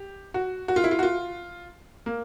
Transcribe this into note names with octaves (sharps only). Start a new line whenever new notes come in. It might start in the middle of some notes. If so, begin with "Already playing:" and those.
Already playing: G4
F#4
F#4
F4
E4
F4
F#4
F4
A#3